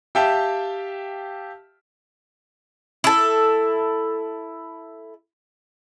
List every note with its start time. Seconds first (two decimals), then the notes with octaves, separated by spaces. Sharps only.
0.15 G4 E5 F5 G5 A5
3.04 E4 A4